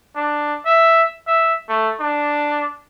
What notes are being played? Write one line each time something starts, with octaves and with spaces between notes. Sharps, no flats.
D4
E5
E5
A3
D4